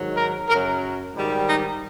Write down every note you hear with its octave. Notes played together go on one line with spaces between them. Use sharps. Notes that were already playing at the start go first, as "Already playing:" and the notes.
Already playing: G#2 D#3 F#3
A#4
F#2 C#3 F#3 A#4
G#2 D#3 G3
D#4